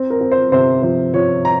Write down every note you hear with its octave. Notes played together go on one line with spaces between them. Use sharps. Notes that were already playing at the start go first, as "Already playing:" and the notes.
Already playing: C4
A#4
C4
C5
C3 C5
F3 C5
F3 C#5
A#5